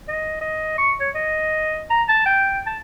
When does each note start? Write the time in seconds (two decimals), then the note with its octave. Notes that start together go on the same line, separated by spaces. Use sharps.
0.08 D#5
0.41 D#5
0.78 C#6
1.00 C#5
1.15 D#5
1.90 A#5
2.09 A5
2.26 G5
2.67 A5